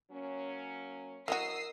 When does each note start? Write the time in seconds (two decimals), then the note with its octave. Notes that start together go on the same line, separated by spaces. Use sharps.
0.11 F#3 A#3 C#4
1.28 F#3 E4 F#4 A#4 D#5 D#6 E6 C7